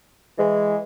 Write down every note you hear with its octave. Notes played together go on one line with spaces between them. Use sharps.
E3 G#3